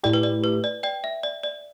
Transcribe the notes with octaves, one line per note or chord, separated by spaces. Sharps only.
A2 A3 E4 G4 D5
B4
D5
B4
D5
D5 G5
E5
D5
D5